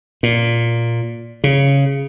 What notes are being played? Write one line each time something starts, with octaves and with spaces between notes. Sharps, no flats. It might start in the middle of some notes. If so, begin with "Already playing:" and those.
A#2
C#3